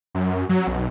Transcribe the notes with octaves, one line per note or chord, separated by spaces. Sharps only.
F#2
F#3
B1